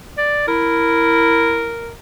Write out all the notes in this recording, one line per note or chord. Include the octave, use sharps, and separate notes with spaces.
D5
E4 A#4